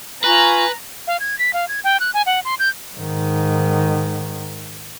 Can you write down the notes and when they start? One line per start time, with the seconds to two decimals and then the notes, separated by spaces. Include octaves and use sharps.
0.24 F4 B4 G#5 A#5 C#6
1.07 F5
1.20 G#6
1.39 B6
1.53 F5
1.68 G#6
1.84 G5
2.00 F#6
2.14 G#5
2.26 F#5
2.45 C6
2.59 G6
2.96 G#2 D#3